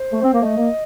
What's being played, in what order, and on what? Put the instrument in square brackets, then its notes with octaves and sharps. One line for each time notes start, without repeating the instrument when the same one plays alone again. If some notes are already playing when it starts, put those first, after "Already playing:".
Already playing: [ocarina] C5
[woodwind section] A3
C4
A#3
[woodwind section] A3 [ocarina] D#5
[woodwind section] A#3